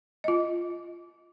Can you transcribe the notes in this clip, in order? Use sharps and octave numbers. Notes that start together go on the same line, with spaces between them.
F4 D#5